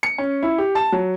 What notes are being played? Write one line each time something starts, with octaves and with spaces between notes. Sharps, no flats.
C#7
C#4
E4
G4
A5
F#3